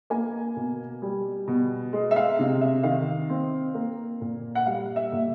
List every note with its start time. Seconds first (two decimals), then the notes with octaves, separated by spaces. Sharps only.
0.10 A#3 G#5
0.56 B2
1.02 G3
1.48 B2
1.93 G#3
2.11 E5
2.16 F5
2.39 C3
2.61 E5
2.83 D#3 F5
3.29 C4
3.74 A#3
4.21 A#2
4.55 F#5
4.66 G3 F5
4.96 E5
5.12 A#2